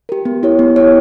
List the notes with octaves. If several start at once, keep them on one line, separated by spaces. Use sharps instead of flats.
G4 A#4
B3
E4 G4 C#5
B3
E4 G4 C#5